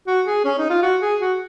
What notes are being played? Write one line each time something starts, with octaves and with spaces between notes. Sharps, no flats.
F#4
G#4
C#4
D#4
F4
F#4
G#4
F#4